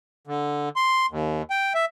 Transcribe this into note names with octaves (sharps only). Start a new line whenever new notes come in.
D3
C6
D#2
G5
E5